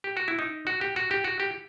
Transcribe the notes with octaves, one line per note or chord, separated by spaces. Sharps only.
G4
F#4
E4
D#4
F#4
G4
F#4
G4
F#4
G4